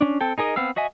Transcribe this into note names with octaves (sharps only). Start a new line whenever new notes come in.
C#4 D4
C4 A4 G5
D#4 G#4 A#4 D#5
B3 C4 F5 E6
F#4 D#5 E5 G#5